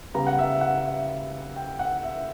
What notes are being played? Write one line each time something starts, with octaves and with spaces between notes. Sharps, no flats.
C#3 G3 B3 A#5
F#5
E5
F#5
E5
G5
F#5
E5